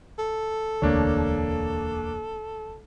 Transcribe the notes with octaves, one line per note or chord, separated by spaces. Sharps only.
A4
E1 D2 A#3 D4 C#5